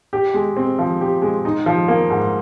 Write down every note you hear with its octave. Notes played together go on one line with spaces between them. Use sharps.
G4
G#3
C4
F3
G4
G#3
D#4
F3
A#3
G#2